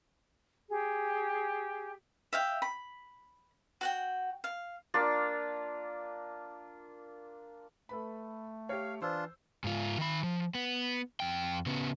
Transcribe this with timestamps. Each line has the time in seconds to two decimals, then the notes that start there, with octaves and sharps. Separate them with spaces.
0.69 G4 G#4
2.33 E5 F5 G5
2.62 B5
3.81 F#4 F#5 G5
4.44 F5
4.94 A#3 D4 F4
7.89 A3 A4 B4 B5
8.69 G4 C#5 F5
9.02 E3 D4 F4 C5 E6
9.64 G#2 F4
9.98 D#3 B5
10.24 F3
10.55 B3
11.20 F2 G5
11.66 C#3 B3